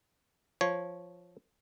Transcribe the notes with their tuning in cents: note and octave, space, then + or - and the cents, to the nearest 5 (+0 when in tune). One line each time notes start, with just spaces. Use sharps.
F3 +0 C#5 -5